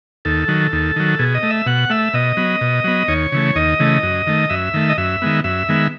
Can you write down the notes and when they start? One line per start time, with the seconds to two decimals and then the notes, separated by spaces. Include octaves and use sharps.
0.25 D#2 A4
0.48 D#3 F#3
0.73 D#2
0.96 D#3 F#3
1.19 B2 G#4
1.35 D#5
1.43 A3
1.50 E5
1.66 B2 F#5
1.90 A3 E5
2.14 B2 D#5
2.37 F#3 B3
2.61 B2
2.84 F#3 B3
3.08 D#2 C#5
3.32 C#3 E3 A3
3.55 D#2 D#5
3.80 C#3 E3 A3
4.03 F#2
4.27 D#3 A3
4.50 F#2 E5
4.74 D#3 A3
4.89 D#5
4.98 F#2 E5
5.22 D#3 G#3 B3
5.44 F#2 E5
5.69 D#3 G#3 B3